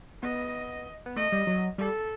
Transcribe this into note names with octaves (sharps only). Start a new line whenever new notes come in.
B3 D#5
B3
A3 D#5
G3
F#3
G3 A4